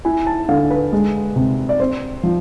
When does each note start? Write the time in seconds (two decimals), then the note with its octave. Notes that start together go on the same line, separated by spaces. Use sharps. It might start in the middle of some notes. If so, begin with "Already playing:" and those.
0.05 E4 G#5
0.27 A5
0.49 D3 F5
0.70 B4
0.92 G#3
1.36 C3
1.69 D5
1.80 C4 C5
2.23 F3